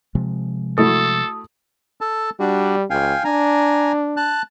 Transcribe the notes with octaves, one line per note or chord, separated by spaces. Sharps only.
C3 F3 G#3
A3 E4 F#4 A4 A5 D#6
A4 A5
G3 D4 F#4
C#2 F5 G5 G#5
D4 G#5 A#5
A5 F#6